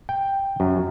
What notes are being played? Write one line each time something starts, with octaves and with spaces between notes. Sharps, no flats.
G5
F#2